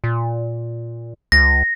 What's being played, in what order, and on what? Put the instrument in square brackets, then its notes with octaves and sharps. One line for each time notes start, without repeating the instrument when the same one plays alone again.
[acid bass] A#2
[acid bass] C#2 [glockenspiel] A#6